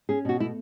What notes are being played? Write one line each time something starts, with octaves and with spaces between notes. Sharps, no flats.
C#4 G#4
B2 F#4
A3 E4